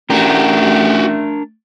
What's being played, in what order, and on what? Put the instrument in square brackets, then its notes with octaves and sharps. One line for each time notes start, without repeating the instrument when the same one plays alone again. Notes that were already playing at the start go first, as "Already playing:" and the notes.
[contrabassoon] A1 [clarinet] A3 [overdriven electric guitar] D4 A#4 [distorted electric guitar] F#4 G4